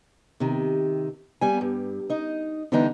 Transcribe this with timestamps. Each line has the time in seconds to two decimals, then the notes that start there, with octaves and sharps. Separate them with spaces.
0.40 C3 D#3
1.41 G3 B3 G#5
1.61 G2
2.10 D#4 D#5
2.72 D3 E3 G3 B3 D4 D#4